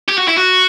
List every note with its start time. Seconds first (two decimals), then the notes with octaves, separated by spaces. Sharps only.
0.09 G4
0.18 F#4
0.28 E4
0.38 F#4